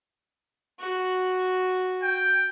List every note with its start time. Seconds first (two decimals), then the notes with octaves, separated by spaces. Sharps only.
0.80 F#4
2.03 G5